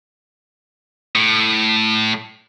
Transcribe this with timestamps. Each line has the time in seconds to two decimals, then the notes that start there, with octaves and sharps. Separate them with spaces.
1.15 A2